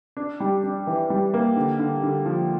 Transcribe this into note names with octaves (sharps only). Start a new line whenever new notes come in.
D4
G3
D4
E3
G3
A#3
D3
D3
D3
F3